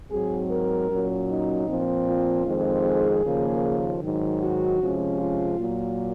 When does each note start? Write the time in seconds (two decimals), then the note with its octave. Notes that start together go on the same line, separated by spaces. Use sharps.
0.11 G#2 F#3 C4 G#4
0.50 A#4
0.90 A#2 F#3 C#4
1.29 D#4
1.67 A#2 F3 C4
2.06 F4
2.45 F2 D#3 G#3 C4
2.85 G#4
3.23 D#2 C#3 F3 A#3
4.02 G#2 D#3 F#3
4.40 F#4
4.79 C3 F3 G#3 C#4
5.18 F4
5.57 A#2 F#3 A#3